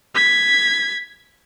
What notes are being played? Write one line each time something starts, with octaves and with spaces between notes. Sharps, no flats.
G#6 B6